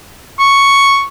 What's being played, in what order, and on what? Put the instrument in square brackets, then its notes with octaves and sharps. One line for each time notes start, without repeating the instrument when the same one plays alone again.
[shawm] C#6